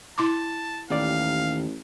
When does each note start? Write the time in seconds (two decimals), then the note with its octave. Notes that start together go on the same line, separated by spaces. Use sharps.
0.18 E4 A5 C6 D6
0.90 A1 D#2 D5 F5